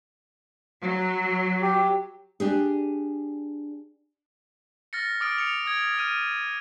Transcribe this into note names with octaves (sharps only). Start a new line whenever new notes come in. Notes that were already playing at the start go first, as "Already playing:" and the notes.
F#3
G4
D4 G4 G#4
F6 A6 A#6 C#7
D6 D#6 F6 A6 D7
C#7 F7
D#6 G#6 D7
F6 D#7